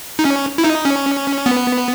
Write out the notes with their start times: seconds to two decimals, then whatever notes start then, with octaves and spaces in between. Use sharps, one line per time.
0.19 D#4
0.25 C#4
0.58 E4
0.64 D#4
0.85 C#4
1.46 B3